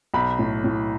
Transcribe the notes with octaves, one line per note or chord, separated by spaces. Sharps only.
B1 B5
A2
A2